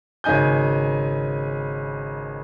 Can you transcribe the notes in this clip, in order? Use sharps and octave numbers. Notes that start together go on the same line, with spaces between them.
G#1 C#3 D#4 G#5 G6